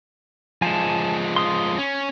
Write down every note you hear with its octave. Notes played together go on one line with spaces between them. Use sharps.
F3 G#3 G#5 A5
C6 D#6
C#4